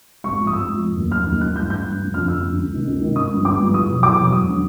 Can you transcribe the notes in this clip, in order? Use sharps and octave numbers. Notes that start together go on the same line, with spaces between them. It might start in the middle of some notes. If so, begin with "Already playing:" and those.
G#1 C#6
G#2 F3
D#6
G#1 E6
G#2 F3
F1
D#2 D#3 F#3
F1 F6
D#2 D#3 F#3
A1 F#6
G2 E3 G6
A1 G6
G2 E3
F1
F2 D3 F3 F6
F1 E6
F2 D3 F3
C#2
C3 D#3
C#2
C3 D#3
G#1 D#6
G2 D3 F3
G#1 D6
G2 D3 F3
E2 D#6
B2 F#3
E2 D6
B2 F#3
E1 D#6
D3 F#3